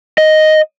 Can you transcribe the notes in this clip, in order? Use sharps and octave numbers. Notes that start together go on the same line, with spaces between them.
D#5